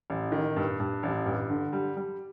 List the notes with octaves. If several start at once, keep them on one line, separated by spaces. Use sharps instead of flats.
A1
D#3
G2
G2
A1
G2
D3
G3
G3